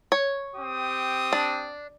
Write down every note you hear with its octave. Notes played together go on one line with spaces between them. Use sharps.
C#5
C4 G4 D#6
D4